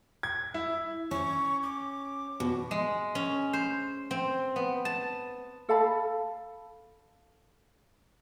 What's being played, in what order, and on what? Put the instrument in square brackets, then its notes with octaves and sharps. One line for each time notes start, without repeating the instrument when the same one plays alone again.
[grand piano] G#6
E4
[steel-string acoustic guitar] C#4 [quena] C#6
[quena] D6
[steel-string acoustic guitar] B2
[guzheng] G#3
C#4
C5
C4
B3
A5
[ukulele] A4 F5 A5 B5